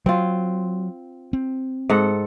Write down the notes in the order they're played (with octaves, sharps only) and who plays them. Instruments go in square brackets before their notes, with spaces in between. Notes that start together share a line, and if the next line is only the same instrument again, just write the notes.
[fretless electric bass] F#3 [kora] C4 F4
[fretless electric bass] C4
[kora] G#2 A4 F#5